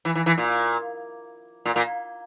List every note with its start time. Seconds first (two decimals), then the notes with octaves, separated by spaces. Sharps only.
0.05 E3
0.15 E3
0.26 E3
0.38 A#2
1.65 A#2
1.76 A#2